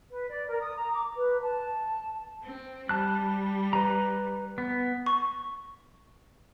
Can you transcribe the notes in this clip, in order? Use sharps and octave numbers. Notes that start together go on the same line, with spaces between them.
B4
D5
A#4
D#6
A#5
D6
B4
A5
C4
G3 A5 F#6
B4 A#5
B3
C#6